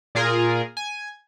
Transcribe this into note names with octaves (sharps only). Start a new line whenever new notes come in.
A#2 F4 G#4 A#4
G#5